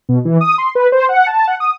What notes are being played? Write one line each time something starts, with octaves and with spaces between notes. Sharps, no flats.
B2
E3
D#6
C6
B4
C5
F#5
A5
F#5
D#6